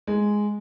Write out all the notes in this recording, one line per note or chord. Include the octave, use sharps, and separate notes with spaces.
G#3